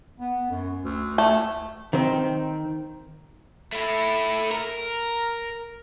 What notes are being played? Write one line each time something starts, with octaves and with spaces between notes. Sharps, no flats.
B3
F#2
D2
A3
D#3 C4
A3 E4
A#4